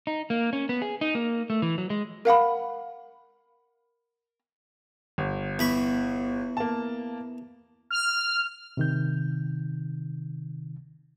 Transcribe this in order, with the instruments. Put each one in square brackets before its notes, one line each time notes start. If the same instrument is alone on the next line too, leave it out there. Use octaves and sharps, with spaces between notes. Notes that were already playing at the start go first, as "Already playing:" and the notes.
[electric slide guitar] D#4
A#3
C#4
B3
G#4
D#4
A#3
A3
E3
F#3
G#3
[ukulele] A#4 F5 F#5 B5
[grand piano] G1
[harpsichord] E2 B5 C#6
[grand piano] A#3 A5
[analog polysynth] F6
[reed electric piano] C3 D#3 G6